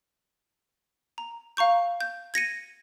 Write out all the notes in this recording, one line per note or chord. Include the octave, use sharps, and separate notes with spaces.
A#5
F5 A#5 C#6 G6
G6
G#6 A#6 C#7 D#7